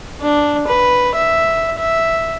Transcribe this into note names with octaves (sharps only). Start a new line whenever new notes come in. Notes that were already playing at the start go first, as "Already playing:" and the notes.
D4
B4
E5
E5